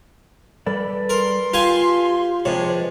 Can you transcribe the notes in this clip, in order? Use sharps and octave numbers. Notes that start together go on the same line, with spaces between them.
G3 A4 B4 D5
A#4 C6
F4 G4 G#5 A5
C3 F3 G#3 B4 C#5